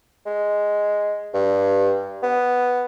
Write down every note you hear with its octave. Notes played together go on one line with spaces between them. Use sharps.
G#3
G2
B3